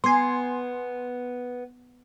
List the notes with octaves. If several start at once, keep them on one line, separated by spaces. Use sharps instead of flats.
B3 G#5 C6